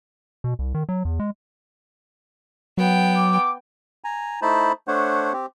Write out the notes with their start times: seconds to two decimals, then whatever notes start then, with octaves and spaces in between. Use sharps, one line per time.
0.44 B2
0.59 C2
0.75 D#3
0.89 F#3
1.05 E2
1.20 G#3
2.78 F#3 B3 G5
3.17 D6
4.04 G#5 A#5
4.42 A3 D#4 E4 C5 A5 B5
4.88 A3 D4 C5 C#5 F#5
5.33 C4 G4